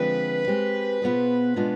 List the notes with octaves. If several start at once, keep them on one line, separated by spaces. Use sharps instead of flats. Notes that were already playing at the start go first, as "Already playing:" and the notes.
Already playing: D3 F3 G#3 C4 B4
G#3 C4 G4 C5
B2 B3 F4 G#4 C5
B2 G#3 B3 D4 F4